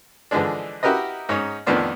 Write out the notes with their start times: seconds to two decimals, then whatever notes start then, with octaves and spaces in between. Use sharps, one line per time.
0.31 D3 E3 F3 G#3 D4
0.83 E4 F#4 G4 A#4 B4 D#5
1.29 G#2 C#4 D#4
1.66 F2 A2 D#3 B3 D4 F4